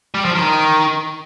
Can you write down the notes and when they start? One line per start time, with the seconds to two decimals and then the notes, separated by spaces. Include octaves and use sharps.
0.14 G3
0.25 F3
0.35 D#3